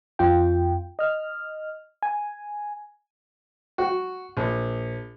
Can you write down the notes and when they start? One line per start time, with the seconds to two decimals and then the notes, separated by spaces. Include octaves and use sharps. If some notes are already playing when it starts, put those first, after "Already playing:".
0.19 F2 F4 G5
0.99 D#5 F6
2.03 G#5
3.78 F#4
4.37 A#1